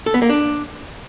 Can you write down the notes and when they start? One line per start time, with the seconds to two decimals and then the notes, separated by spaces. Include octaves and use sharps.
0.06 A4
0.14 B3
0.22 A#3
0.30 D4